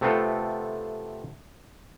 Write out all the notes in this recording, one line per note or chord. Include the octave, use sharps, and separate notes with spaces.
C3 A3 B3 C4 F4 A4